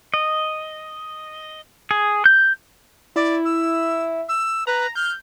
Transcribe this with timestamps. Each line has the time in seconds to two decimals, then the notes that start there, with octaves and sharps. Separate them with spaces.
0.14 D#5
1.91 G#4
2.26 G6
3.16 E4 D5
3.45 E6
4.29 E6
4.67 B4 A#5
4.95 F6 G6